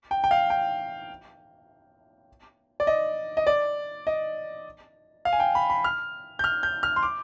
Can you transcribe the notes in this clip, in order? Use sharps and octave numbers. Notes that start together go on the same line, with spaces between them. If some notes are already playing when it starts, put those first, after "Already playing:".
G5
G5
F5
G5
D5
D#5
D#5
D5
D#5
F5
G#5
G5
B5
B5
F6
G6
F6
G6
F6
C6
D6